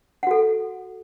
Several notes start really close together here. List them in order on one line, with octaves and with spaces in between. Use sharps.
F#5 F#4 A4